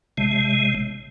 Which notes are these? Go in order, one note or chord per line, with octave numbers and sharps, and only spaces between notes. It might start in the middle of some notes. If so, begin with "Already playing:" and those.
A1 C3 G#3